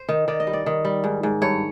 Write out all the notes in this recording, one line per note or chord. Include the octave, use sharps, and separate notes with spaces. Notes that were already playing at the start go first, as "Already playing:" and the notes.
Already playing: C5
D#3
D#3 D5
D#5
G3
D5
D#3
G3
G#2
G#2
G2 C#5